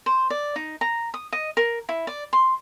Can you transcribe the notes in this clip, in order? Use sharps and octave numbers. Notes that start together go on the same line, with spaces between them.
C5
D5
D#4
A#5
D#6
D#5
A#4
E4
D5
C6